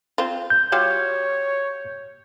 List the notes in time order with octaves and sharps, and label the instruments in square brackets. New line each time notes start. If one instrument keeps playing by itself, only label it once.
[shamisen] C4 F4
[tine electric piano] G6
[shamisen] G3 F4 F#4 [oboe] C#5